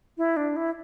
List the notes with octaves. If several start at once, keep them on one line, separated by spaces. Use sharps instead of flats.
E4
D4
E4